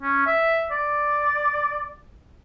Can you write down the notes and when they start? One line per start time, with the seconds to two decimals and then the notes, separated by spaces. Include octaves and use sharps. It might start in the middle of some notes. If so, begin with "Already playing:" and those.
0.02 C#4
0.27 E5
0.71 D5